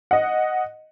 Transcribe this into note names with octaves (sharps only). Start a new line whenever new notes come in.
D#5 F#5